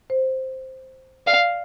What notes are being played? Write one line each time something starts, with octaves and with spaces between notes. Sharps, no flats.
C5
D5 F5